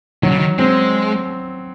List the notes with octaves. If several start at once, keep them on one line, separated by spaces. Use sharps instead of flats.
D#3 F#3
C#3
D#3
G#3 C4